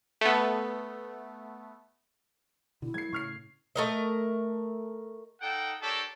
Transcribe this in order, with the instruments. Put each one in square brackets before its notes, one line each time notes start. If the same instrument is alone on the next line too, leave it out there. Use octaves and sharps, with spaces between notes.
[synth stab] A3 B3
[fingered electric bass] B2 D3 [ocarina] E4
[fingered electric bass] F3 G#3 A#3 [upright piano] G#6 C7
[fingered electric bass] A2 C#3 [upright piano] C#6 F6 C7
[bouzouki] A3 A#4 D#5
[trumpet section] D#4 A4 F#5 G5
D4 G4 A4 A#4 C#5